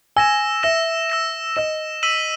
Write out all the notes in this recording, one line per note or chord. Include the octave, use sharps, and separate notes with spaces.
G#5 E6 A#6 E7
E5 E6 A#6 E7
E6 A#6 E7
D#5 E6 A#6 E7
E6 B6 D#7 F#7